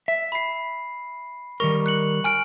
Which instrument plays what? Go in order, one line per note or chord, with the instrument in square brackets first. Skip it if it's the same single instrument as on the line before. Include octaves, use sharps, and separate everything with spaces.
[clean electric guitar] E5
[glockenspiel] B5 C7
[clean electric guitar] D#3 G3 A#4 [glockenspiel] C#6
[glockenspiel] F#6 C#7 F#7
G#5 F6 D7